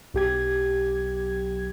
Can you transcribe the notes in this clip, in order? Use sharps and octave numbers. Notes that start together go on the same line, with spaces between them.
B1 G4 G#6